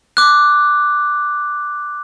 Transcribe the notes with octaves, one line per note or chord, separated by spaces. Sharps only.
D6 F#6